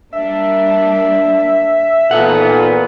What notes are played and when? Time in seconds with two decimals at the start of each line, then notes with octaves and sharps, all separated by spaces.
0.13 G3 A#3 D4 E5
2.11 A#2 E3 B3 D#4 G#4 A4 F#5